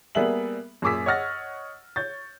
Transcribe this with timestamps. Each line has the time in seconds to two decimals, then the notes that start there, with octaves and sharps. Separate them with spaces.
0.15 G3 A#3 B3 G#4 E5 F#7
0.82 F#2 A#2 G#4 D6 E6 B6
1.06 C#5 D#5 F#5 F6 A6 A#6
1.96 C#5 G6 A6